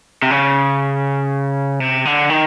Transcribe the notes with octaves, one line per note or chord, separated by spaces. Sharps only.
C3
C#3
C3
D3
D#3